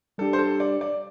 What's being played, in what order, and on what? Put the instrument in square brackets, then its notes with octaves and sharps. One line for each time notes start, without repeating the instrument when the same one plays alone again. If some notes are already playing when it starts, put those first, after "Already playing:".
[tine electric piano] G3 D4 G4 [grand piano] A4
[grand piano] C5
A4
D5
D5